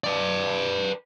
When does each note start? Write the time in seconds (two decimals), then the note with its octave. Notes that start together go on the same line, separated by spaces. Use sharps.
0.04 B4 D5